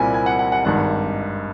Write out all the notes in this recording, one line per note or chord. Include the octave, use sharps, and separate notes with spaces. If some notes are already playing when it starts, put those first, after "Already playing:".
Already playing: C2 A#2 G3 C4 E4 G#5
G#5
F#5
F#5
F#5
G#1 G2 D#3 G#3 F#5